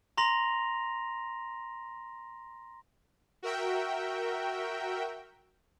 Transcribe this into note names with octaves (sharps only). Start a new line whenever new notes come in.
A#5 C6 A#6 F7
F#4 A#4 E5 G5